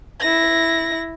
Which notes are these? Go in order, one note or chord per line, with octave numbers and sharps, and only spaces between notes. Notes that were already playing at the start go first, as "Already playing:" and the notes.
E4 A#6